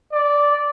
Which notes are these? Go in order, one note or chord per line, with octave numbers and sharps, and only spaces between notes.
D5